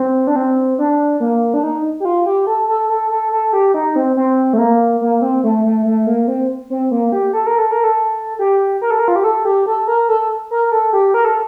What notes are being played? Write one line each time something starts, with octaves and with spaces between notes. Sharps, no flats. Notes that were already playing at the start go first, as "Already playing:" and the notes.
Already playing: C4
D4
C4
D4
A#3
D4
D#4
G4
F4
G4
A4
A4
A4
A4
A4
G4
D#4
C4
C4
A3
A#3
A#3
C4
A3
A3
A3
A#3
C4
C4
A#3
G4
A4
A#4
A4
A#4
A4
G4
A#4
A4
A#4
F4
G4
A4
G4
A4
A#4
A4
A#4
A4
G4
A#4
A4